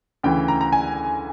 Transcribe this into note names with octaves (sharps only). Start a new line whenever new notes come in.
D2 C#3 E3 G5
A#5
A#5
G#5